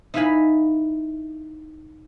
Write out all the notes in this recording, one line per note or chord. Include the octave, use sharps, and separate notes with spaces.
D#4 E4 B4 F5 G#5 B5